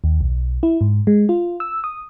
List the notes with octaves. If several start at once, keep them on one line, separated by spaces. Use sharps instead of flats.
D#2
B1
E4
G#2
G#3
F4
E6
D#6